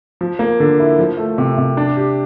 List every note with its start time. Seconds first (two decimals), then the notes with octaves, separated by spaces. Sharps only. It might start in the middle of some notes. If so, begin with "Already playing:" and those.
0.21 F3
0.39 A#3
0.60 D3
0.79 E4
0.99 F3
1.17 A3
1.38 C3
1.58 C3
1.77 D4
1.96 G4